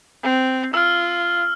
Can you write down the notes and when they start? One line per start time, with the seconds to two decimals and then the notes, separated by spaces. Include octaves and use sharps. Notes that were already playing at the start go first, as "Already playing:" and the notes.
0.23 C4
0.74 F4 E6 F6